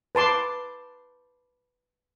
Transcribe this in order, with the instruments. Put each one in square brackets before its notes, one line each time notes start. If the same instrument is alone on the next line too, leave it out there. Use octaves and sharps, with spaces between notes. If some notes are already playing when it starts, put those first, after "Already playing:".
[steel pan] B4 A5 C6 D6